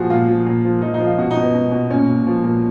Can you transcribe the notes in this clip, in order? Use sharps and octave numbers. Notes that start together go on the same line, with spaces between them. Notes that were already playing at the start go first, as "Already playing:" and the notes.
Already playing: A#2 F3 F#4 G#4
A#2 F4
F3
A#2
F3
F3 D#4
D#4
F3
F4
B2 F#4
D#4
B2
B3
B2
B2
A#2 C#4
A#2
F3
A#2